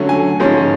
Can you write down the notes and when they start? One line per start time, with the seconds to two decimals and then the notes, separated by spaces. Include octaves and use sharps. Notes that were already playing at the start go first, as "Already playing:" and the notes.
Already playing: D3 F#3 A3 C#4
0.09 G#5
0.40 G#2 F3 G#3 C#4